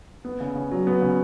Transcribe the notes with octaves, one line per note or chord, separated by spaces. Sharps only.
B3
C#3
C#3
F#3
B3
C#3